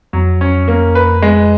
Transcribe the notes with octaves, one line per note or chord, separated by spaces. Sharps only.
F2 F#3
C#4
A#3
B4
G#3